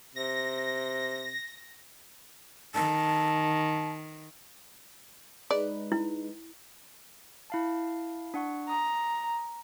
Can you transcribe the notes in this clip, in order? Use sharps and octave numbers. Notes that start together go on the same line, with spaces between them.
C3 A#6
D#3 A5
G#3 D#4 B4 D5
E4
E4 F5 A5
D4 F#5 C#6
A#5 D#6